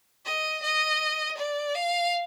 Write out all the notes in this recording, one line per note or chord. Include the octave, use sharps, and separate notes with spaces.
D#5
D#5
D5
F5